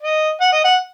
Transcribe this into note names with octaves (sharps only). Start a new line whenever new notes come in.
D#5
F#5
D#5
F#5